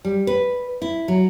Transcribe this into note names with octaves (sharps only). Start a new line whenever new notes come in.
G3
B4
E4
F#3